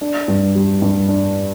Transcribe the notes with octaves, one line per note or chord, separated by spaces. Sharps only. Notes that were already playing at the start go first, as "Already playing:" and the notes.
D4
G2
G3
G2
D4